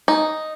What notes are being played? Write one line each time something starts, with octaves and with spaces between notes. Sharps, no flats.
D#4